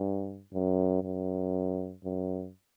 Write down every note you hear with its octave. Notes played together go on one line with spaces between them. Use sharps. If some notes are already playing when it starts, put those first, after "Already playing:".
Already playing: G2
F#2
F#2
F#2